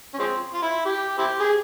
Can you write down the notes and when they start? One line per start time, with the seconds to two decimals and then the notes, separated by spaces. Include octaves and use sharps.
0.14 C#4
0.19 F3 G#3 C4
0.54 F4
0.62 E4
0.85 G4
1.18 C4 E4 G4
1.40 G#4